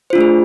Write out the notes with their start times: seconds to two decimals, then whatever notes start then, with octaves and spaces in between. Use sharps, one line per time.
0.10 C5
0.13 F4
0.15 D4
0.18 A3
0.21 G#4